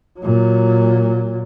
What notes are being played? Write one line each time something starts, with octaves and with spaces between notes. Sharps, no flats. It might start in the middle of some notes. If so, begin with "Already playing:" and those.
A#2 F#3